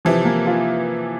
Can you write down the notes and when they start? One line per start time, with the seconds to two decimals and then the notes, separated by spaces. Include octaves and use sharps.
0.05 C3 E3 F3
0.25 A#3
0.47 F4